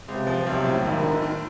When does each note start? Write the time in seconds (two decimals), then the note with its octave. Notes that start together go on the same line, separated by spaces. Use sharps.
0.08 C#2 C3
0.27 F3
0.46 B1 C3
0.65 A2
0.84 G#1 D#3
1.04 D3
1.22 D#3